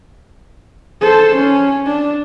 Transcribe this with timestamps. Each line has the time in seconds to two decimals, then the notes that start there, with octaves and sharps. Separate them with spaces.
1.01 A4 C5
1.36 C#4
1.86 D4